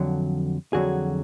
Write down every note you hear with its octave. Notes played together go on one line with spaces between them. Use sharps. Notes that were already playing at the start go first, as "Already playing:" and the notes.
Already playing: F2 D3 F#3
F2 D3 F#3 F#4 G#4